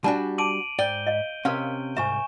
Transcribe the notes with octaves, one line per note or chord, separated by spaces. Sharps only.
G3 D4 F#4 G#5 A5
A5 D6 D7 D#7 F#7
G#2 D5 G5 G6 G7
D#5 F5
C3 C#4 A#4 F5
C2 G#2 E5 G#5 C#6 E7